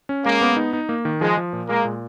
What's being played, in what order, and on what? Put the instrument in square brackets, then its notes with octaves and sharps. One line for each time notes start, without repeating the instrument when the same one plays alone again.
[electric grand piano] C#4
[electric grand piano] G#3 [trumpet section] A#3
[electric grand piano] B3
D#4
D#4
A#3
D#3
[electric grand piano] F3 [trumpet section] G#3
[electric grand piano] F3
A#2
[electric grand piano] G#3 [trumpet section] A#3
[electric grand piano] A#2